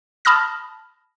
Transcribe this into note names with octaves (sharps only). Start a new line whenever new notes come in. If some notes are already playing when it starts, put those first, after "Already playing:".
A5 B5 D#6 F6 A#6